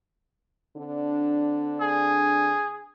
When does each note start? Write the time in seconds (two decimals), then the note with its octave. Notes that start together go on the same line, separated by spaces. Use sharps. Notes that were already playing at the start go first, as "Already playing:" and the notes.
0.77 D3 C4 D4
1.80 G#4